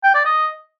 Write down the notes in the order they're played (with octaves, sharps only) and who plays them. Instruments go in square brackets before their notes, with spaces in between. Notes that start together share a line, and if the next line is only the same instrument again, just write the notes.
[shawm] G5
D5
D#5